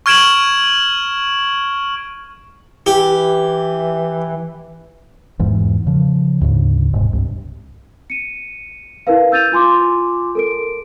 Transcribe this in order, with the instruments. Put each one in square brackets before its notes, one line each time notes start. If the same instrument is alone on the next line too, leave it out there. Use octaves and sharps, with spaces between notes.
[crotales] C#6 F6 G#6 D7 E7 F#7
[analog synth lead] E3 [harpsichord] G4
[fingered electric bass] E2 G#2 E3
C#3 F3
D2 G#2 C#3
E1 G#2 C3
C2 G2
[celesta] C#7 D#7
E4 A#4 B4 F5
E6 G6 A6 D#7 F7
F4 G#5 C6 D6
A4 A#4 D7